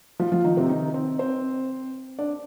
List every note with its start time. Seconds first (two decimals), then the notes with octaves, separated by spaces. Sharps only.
0.20 F3 F4
0.32 F3 F4
0.44 D#3 D#4
0.57 C3 C4
0.69 D#3 D#4
0.94 C4 C5
1.19 C4 C5
2.18 D4 D5